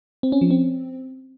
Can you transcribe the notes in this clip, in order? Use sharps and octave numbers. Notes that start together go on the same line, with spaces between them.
C4
C#4
F3
C4